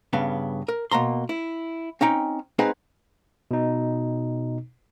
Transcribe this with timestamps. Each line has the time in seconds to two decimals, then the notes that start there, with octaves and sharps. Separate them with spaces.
0.13 G2 C#3 B3
0.68 A#4
0.91 B2 A#3 A#5 C6
1.29 E4
2.01 C4 C#4 D#4 G5
2.59 G#3 C4 D#4 G#4 B4 F#5
3.51 B2 D#4